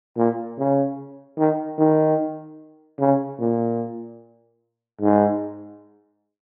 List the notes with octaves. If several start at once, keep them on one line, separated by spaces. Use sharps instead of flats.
A#2
C#3
D#3
D#3
C#3
A#2
G#2